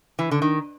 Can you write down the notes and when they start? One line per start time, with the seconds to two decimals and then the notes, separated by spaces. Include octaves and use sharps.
0.19 E3
0.31 D3
0.42 D#3